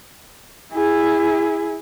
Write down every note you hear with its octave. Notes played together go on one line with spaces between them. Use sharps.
E4 G#4